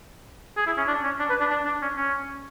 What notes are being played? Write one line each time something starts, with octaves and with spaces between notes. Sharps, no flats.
G#4
E4
C#4
D4
C#4
D4
B4
D4
D4
D4
C#4
C#4